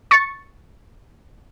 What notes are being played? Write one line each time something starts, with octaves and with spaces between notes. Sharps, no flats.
C#6 A6 C#7